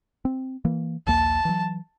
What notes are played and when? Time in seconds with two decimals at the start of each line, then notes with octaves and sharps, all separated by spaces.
0.25 C4
0.65 E3 A#3
1.07 A#1 D#2 A#3 A5
1.45 E3 F#3